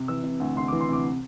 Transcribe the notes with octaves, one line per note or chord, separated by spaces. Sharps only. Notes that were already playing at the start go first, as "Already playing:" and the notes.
Already playing: C3
E3 E6
C3
D2
D2 C6
E3 D6
C6
C3 D6